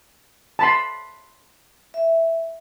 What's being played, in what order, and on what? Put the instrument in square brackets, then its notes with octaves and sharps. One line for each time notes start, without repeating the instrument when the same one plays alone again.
[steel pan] A5 B5 C6
[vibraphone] E5